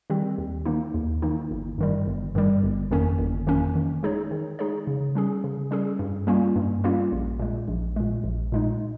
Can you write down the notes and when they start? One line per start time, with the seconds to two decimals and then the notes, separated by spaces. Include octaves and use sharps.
0.10 D#3 G3 C4 G4
0.38 D#2
0.65 D#3 A#3 D#4
0.94 D#2
1.22 D#3 A#3 D#4
1.51 G1
1.78 G2 D#3 G3
2.06 G1
2.35 G2 D#3 G3
2.63 G1
2.91 F2 D#3 A#3 C#4
3.19 G1
3.47 F2 D#3 A#3 C#4
3.75 D#3
4.03 G#3 D#4 G#4 C#5
4.31 D#3
4.59 G#3 D#4 G#4 C#5
4.87 C#3
5.15 G3 C#4 G#4
5.44 C#3
5.71 G3 C#4 G#4
5.99 G2
6.27 G3 A#3 C#4 F4
6.56 G2
6.84 G3 A#3 C#4 F4
7.12 A#1
7.39 A#2 G#3
7.68 A#1
7.96 A#2 G#3
8.24 A#1
8.52 A#2 G#3 D#4